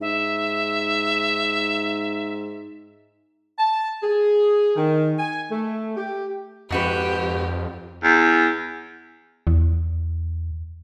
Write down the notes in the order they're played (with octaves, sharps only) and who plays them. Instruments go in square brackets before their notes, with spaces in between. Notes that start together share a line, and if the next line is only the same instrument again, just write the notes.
[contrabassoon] G#2 [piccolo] E5
[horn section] A5
G#4
D#3
G#5
A3
G4
[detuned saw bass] F2 [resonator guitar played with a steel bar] G#2 F#4 B4 [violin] G4
[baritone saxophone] E2
[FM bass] E2